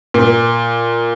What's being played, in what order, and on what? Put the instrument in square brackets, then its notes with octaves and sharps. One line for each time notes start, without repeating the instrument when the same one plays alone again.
[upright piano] A#2